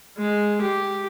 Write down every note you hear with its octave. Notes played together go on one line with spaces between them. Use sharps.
G#3
G4